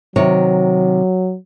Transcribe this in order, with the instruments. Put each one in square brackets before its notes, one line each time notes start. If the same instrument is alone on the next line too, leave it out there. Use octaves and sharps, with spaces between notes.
[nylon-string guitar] C3 D#3 C#5 [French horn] F#3